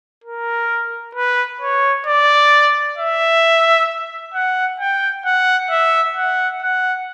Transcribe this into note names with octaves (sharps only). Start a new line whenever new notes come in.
A#4
B4
C#5
D5
E5
F#5
G5
F#5
E5
F#5
F#5